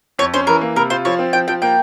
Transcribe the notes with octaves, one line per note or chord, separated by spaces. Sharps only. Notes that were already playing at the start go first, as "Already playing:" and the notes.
F2 C#5
C#4 C5
E3 A#4
A#3
C3 A#4
F4 C5
F3 C#5
C4
F3 G5
F3 G5
A#3 G5